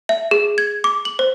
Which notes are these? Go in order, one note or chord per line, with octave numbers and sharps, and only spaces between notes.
E5
G#4
G#6
D6
F#7
C5